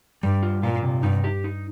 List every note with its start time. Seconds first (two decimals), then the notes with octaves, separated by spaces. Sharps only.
0.23 G2 G3
0.43 F4
0.63 A#2 F4
0.83 C3
1.03 G2 D#4
1.24 G4
1.44 D#4